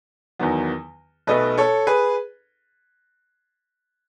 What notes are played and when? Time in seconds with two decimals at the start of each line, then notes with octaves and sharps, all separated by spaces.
0.39 E2 D#3 F#3 B3
1.27 B1 B2 A3 B4 D#5
1.58 A4 C#5
1.87 G#4 B4